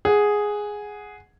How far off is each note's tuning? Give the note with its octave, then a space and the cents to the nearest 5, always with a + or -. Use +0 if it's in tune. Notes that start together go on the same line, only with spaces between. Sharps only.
G#4 +0 F#5 +0